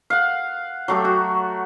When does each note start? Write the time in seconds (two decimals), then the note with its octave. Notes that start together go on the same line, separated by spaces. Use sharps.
0.10 F5 F#5
0.88 F#3 A3 G4
1.05 F#4